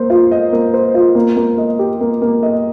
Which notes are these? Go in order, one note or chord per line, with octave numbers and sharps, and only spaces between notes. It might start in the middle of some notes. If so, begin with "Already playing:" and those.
Already playing: A#3 C5
F4
D#5
A#3
C5
F4
A#3
A#3
D#5
G4
A#3
A#3
D#5